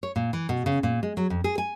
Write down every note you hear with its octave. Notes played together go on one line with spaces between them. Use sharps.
C#5
A#2
E3
B2
C#3
A#2
G#3
F#3
F2
G#4
G#5